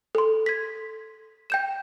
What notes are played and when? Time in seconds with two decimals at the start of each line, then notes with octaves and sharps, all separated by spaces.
0.15 A4 C6
0.46 G#6 B6
1.50 G5 G6 E7